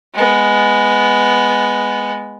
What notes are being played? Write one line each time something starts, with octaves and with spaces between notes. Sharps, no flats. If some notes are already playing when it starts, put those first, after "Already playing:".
G#3 B3